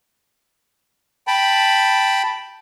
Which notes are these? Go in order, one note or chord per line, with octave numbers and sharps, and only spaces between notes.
G5 A5 B5